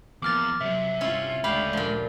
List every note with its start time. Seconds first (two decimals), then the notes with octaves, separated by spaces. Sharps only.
0.22 E2 F3 A#3 D6 F6 A6
0.61 C3 F#3 E5
1.01 G2 C#4 E4 F4
1.44 D2 D3 G#3 G4 C#5 F5 B5
1.73 A#2 F3